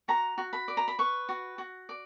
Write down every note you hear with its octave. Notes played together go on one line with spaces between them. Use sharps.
F#4 A#5
F#4
B5
D5
A#5
B5
B4 C#6
F#4
F#4
D5